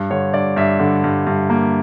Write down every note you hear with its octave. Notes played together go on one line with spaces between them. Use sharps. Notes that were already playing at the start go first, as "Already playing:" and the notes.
Already playing: G2
D3 C#5
G2 D5
G2 E5
D3
G2
G2
A#3